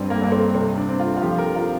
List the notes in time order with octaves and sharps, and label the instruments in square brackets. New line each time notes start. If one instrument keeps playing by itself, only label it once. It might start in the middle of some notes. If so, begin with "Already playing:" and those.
Already playing: [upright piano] G2 G3 [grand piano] C4 D4
[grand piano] A#3
[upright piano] G2 [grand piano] A#3
[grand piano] C4
[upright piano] C3 [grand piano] C4
[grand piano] D4
[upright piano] C4
[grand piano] F4
F4
[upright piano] F3 [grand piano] G4
[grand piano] A#4
F4